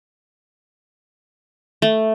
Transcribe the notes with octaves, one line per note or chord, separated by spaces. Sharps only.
A3